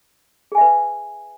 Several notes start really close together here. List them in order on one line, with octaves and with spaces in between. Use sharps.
G#4 G#5 E5 B4